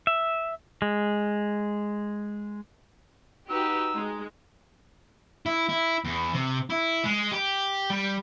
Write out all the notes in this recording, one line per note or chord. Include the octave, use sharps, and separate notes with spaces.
E5
G#3
D#4 F#4 G4 B4 E6
G#3
E4
E4
E2
C3
E4
G#3
G4
G3